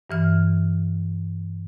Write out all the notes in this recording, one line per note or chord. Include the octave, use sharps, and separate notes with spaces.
G2 E3 F6